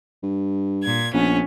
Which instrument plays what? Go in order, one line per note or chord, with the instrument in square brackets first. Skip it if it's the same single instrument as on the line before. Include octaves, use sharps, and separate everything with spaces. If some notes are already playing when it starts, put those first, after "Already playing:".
[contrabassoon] G2
[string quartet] A#2 G#6
[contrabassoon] A#1 [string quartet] B3 C#4